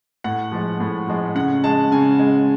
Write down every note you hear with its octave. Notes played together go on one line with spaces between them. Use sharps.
A2 F#5
F3 G#3
A2
F3 G#3
C#3 F#5
G#3 A5
C#3 G#5
G#3